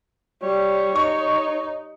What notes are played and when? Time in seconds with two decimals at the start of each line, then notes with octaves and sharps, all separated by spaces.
0.43 G3 C#5
0.96 D#4 C#6